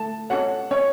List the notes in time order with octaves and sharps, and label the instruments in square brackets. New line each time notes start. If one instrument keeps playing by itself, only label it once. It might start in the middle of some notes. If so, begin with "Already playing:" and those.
Already playing: [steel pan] A3 [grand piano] A5
[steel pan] C#4 F#4 A4 C#5 [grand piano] F#5
[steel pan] C#4 [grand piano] C#5